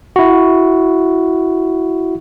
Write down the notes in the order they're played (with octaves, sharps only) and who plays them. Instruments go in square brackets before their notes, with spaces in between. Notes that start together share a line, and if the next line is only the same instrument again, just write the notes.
[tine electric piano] E4 F#4